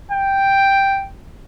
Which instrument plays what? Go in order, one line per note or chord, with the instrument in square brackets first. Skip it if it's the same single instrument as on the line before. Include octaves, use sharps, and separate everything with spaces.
[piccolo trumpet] G5